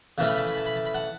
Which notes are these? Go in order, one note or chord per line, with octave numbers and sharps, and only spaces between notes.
C#3 E3 A3 C#4 A5
B5
A5
B5
A5
B5
A5
B5
F#5 A5